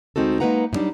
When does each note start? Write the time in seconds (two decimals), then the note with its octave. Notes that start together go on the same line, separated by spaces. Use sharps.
0.16 D2 G#3 C4 D#4 F#4 A4
0.40 G#3 A#3 D#4 B4 F#5 A#5
0.73 A2 F#3 G3 D4 D#4